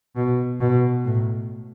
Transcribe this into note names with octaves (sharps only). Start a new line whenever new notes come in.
B2
B2
A2